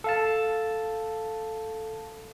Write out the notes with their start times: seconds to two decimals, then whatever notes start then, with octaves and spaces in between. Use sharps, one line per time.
0.04 A4 F5 A5